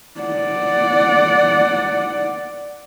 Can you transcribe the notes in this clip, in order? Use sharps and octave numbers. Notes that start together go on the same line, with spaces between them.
D5 F#5